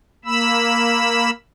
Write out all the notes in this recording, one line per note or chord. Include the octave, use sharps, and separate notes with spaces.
A#3 B5 E6